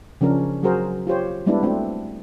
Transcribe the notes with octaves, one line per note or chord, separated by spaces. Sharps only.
C#3 F3 C#4 D4 A#4
F#3 F#4 G#4 A#4 C5
F4 G4 C5 C#5
G3 G#3 B3 D4 E4
A3 C4 D4 F#4